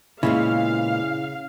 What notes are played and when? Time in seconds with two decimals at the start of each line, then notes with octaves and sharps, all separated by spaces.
0.23 A#2 C#3 G#3 B3 E4 F5